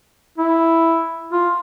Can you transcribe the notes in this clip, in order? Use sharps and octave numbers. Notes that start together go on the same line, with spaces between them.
E4
F4